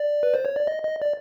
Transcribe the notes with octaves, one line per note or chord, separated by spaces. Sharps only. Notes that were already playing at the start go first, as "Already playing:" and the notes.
Already playing: D5
B4
C5
C#5
D5
D#5
D#5
D5